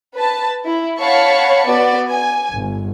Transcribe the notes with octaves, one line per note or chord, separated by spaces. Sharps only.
B4 A5
E4
C#5 F5 F#5 A5 B5 C#6
B3 F#4 D5
G#5
G1